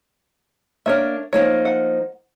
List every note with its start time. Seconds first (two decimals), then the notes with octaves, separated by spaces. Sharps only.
0.86 A#3 D4 A#4 C#5 E5
1.33 F3 A#3 D#4 C#5
1.65 F#5